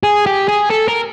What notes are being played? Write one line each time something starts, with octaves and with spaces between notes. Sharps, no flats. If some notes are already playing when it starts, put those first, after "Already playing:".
G#4
G4
G#4
A4
A#4